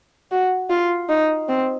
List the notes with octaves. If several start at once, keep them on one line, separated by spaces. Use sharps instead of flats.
F#4
F4
D#4
C4